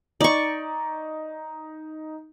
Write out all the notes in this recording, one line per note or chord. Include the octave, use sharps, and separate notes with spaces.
D#4 D5 C#6